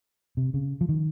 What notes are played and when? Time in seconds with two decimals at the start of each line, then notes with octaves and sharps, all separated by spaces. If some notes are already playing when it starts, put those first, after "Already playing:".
0.37 C3
0.54 C#3
0.81 F3
0.89 D#3